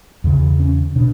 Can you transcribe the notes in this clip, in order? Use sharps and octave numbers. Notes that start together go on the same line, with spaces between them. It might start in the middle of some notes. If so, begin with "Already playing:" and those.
E2 C#3
C#4
B2 D4